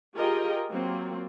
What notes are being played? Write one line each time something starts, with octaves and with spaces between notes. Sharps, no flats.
F4 G4 G#4 A#4 D#5 G5
F#3 A#3 C4 F4